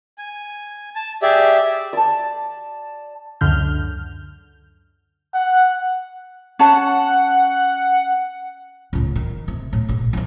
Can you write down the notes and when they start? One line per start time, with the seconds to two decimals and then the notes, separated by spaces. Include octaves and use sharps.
0.18 G#5
0.96 A5
1.22 G4 G#4 D5 E5
1.93 D5 A5
3.41 C#2 F#2 D3 F6 G6
5.34 F#5
6.59 C#4 F#5 A5
8.93 C#2 A2
9.16 D#3
9.48 C3
9.73 A2
9.89 A#1 D3
10.13 D#3 E3